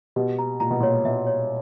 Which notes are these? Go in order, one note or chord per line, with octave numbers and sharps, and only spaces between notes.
B2 G4
A#5
A#2 A#5
B2
A#2 C#5
B2 E5
C#5